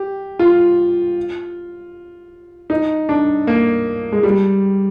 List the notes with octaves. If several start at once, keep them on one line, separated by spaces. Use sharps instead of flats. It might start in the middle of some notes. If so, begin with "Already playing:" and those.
Already playing: G4
F4
D#4
D4
A#3
G#3
G3